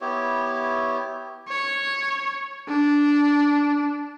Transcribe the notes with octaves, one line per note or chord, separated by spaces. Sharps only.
B3 E4 G4 C#5
C#5
D4